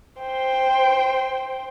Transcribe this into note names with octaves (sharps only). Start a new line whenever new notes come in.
C5 G5